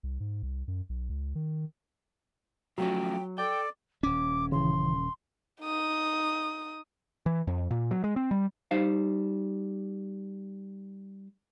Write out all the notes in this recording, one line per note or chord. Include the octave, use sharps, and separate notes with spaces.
C2
G#2
C2
F#2
B1
C#2
D#3
F3 F#3 A3 C#4 G5
A4 D5 G5
D#1 C#4 D6
C#3 E3 C6
D#4 D#6
E3
F2
A#2
F#3
G#3
C4
G3
G3 D#4 C5 F5